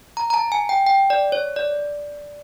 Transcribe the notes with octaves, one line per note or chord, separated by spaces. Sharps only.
A#5
A#5
A5
G#5
G5
G5
D5
C#5
D5